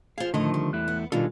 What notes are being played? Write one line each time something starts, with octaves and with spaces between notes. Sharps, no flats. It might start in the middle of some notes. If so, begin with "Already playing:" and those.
F4 G#4 C5 F5
A2 D3 D#3 F3 A3 D#4 D#5
G3
E2 A3 E4 F#6
B3
B2 D#3 G3 G#3 D4 F4 A4